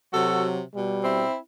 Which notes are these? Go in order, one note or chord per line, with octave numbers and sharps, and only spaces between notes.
C3 F#3 F#4 A4
B2 G3
C4 E4